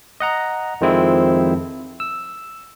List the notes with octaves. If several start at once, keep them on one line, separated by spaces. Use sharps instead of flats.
D#5 F#5 A#5
F2 D#3 F3 G#3 C4 E4
E6